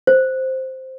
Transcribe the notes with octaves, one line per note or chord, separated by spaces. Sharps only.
C5